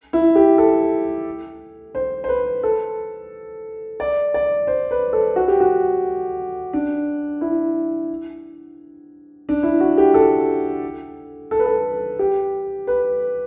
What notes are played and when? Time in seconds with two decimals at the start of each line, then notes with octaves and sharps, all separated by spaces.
0.13 E4
0.35 G4
0.58 A4
1.95 C5
2.24 C5
2.28 B4
2.63 A4
4.00 D5
4.34 D5
4.67 C5
4.91 B4
5.13 A4
5.36 F#4
5.48 G4
5.60 F#4
6.73 D4
7.41 E4
9.49 D4
9.63 E4
9.80 F#4
9.98 G4
10.14 A4
11.51 A4
11.59 B4
11.66 A4
12.19 G4
12.87 B4